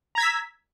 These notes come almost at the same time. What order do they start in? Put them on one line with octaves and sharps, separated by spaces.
A#5 G#6 B6 E6